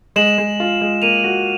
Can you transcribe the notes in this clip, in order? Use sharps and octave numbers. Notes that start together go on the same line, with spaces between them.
G#3 E7 F#7
G#3
F4
G#3
A#3 D#7 F7
F#4